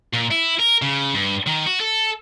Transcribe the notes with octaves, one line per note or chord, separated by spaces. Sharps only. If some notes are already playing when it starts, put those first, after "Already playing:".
A#2
E4
A#4
C#3
G2
D#3
F#4
A4